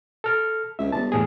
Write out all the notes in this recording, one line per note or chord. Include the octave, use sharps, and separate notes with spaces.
A4 F6
C#2 E5
G1 A5
E2 A2 G#4